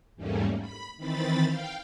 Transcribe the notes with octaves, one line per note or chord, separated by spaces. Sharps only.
E2 G#2 G3 A3 A#3 C#4
B5
D#3 E3 C4 B5 A6
F5 G5